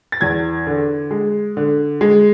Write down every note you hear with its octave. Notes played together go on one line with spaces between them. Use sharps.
A6
E2 G#6
D3
G#3
D3
G#3